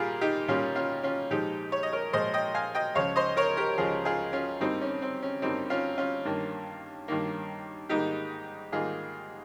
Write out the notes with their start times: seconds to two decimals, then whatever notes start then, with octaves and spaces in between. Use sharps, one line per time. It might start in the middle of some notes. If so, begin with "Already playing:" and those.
Already playing: A#2 G3 A#3 F4 G4 G#4 A#4
0.21 D#4 G4
0.48 A#2 G3 A#3 C#4 F4
0.76 C#4 F4
1.03 C#4 F4
1.30 A#2 F3 G#3 D#4 G4
1.72 C#5
1.83 D#5
1.92 A#4 C#5
2.13 A#2 F3 G#3 C5 D#5
2.34 D#5 G5
2.55 F5 G#5
2.75 D#5 G5
2.95 C#2 C#3 F3 C#5 F5
3.16 C5 D#5
3.37 A#4 C#5
3.57 G4 A#4
3.77 C#2 C#3 F3 F4 G#4
4.05 F4 G#4
4.33 C#4 F4
4.60 G2 G3 A#3 C4 D#4
4.81 C#4
5.02 C4
5.23 C#4
5.42 G2 G3 A#3 C4 D#4
5.70 C#4 F4
5.98 C#4 F4
6.25 G2 D#3 A#3
7.08 G2 D#3 A#3
7.89 G#2 D#3 G3 A#3 D#4 G4
8.72 G#2 D#3 G3 A#3 F4 G#4